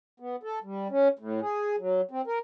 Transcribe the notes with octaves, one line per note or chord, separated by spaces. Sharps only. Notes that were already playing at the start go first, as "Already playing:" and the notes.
B3
A4
G3
C#4
A2
G#4
F#3
C4
A#4